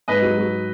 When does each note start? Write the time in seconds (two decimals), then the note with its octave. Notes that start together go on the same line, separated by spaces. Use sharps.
0.08 G#2 B4 D#5
0.22 F#3
0.38 F#3